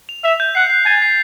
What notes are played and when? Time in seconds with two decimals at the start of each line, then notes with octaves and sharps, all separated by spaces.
0.09 F7
0.24 E5 F7
0.40 G6
0.55 F#5 C7
0.70 C7
0.86 G#5 A6
1.02 C7